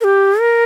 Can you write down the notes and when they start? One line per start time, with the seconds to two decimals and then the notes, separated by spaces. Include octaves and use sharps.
0.01 A#4
0.04 G4
0.40 A#4